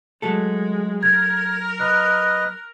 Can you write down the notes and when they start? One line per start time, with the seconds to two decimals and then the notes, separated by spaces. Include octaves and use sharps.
0.22 F#3 G#3 A3 A4
1.03 A#4 G#6
1.80 B4 D#5 F#6